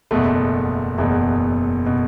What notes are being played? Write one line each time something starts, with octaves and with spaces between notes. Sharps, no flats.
F#1 E2 B2 A3
F#1 E2 B2
B2